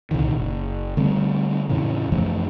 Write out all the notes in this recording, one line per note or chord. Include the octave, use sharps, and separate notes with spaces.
C2 A#2 D3 D#3
F#1
D3 G3 A3 C4
F2 A2 C#3 E3
F#2 E3 F3 A3